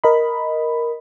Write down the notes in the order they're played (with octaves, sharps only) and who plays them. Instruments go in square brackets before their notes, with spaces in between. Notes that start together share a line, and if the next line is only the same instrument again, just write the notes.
[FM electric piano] A#4 D#5 B5